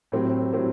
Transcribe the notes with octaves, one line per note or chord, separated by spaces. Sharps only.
A2 F#3 C4 G4
A2 F#3 C4 G4